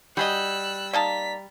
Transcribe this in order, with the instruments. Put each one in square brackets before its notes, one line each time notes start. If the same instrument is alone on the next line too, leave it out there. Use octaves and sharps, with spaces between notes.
[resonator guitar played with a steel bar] G3 [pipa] F#4 G#4 D#5 [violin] E6 F#6
[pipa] A#3 D#4 A5 [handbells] D5 A#5 [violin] B6